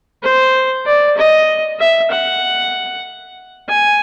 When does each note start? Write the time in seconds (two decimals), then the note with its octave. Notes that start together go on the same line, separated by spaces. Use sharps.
0.23 C5
0.86 D5
1.17 D#5
1.79 E5
2.11 F#5
3.68 G#5